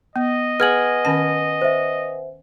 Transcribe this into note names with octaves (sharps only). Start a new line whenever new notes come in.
B3 D#5
G#4 B4 F#5 G#5 F6 G#6 F#7
D#3 C#4 A5
C5 E5